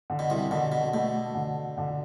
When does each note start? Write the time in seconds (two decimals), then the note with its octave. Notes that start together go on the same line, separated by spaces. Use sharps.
0.10 D3
0.19 B2
0.30 C2 C3
0.51 B2 D3
0.72 B2
0.94 B2 A3
1.35 D3
1.78 D3